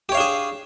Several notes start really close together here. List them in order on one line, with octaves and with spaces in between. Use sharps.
G4 C#5 F5 D4 G#4